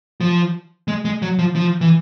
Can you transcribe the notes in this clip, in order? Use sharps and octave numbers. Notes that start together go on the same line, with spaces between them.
F3
G#3
G#3
F#3
F3
F3
E3